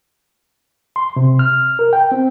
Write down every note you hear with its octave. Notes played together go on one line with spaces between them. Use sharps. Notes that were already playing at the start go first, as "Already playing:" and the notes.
C6
C3
F6
A#4
G5
C4